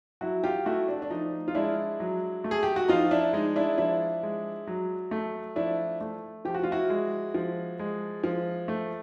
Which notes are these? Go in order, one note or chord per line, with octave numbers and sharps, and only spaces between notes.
F#3 E4 F#4
F4 G4
A3 E4 F#4
D4
D4
F3 D#4
F4
G#3 D4 E4
F#3
A3
G#4
G4
F#4
F3 D#4 F4
D4 E4
G#3 D#4
D4 E4
F3 D4 E4
G#3
F#3
A3
F3 D4 E4
A3
F3 G4
F#4
F4
E4 F#4
G#3
F3
G#3
F3
A3